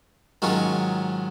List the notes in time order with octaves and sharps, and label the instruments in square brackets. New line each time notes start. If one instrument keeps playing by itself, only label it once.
[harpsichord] G#2 D#3 F#3 C#4 F4